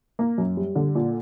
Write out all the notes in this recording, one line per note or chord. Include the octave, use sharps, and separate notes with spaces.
A#3
F#2
G3
D3
A#2